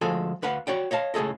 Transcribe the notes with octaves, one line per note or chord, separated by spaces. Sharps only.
D2 F3 G#3 A4 G#5
D2 B4 F5 F#5
F#4 C#5 D5 G5
C#5 D#5 F5 A5
C#2 A2 G#4 A4 D#5